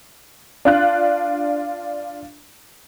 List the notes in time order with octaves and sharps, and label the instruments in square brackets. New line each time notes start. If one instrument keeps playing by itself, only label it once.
[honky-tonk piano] D4 F4 F#6